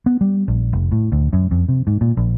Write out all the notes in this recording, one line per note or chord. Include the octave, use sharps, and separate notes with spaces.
B3
G3
A#1
F1
A2
D2
F#2
F2
C3
G#2
A#2
A#1